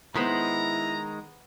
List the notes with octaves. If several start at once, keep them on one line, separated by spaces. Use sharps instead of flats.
D#3 G#3 B3 E4 C5 A#5 B5